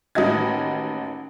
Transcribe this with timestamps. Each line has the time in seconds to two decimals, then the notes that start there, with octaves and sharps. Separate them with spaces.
0.15 A1 D#2 F#4 D#5 G#6